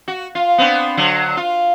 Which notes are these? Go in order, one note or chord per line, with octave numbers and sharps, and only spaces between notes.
F#4
F4
B3 C4 D4
D3 F#3
F4